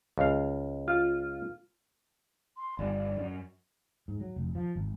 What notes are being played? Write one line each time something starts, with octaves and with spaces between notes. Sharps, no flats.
C#2 F5
F4
C6
G1 D5
F#2
G#2
F#3
F1
F3
G#1